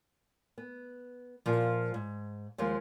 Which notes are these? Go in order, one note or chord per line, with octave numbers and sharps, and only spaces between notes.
B3
A#2 F3
G#2
D#2 F3 G#3